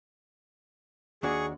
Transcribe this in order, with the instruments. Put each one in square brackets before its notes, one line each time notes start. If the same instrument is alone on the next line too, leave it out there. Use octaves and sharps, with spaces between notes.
[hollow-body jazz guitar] D#2 D4 F#4 [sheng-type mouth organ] G#4 C#6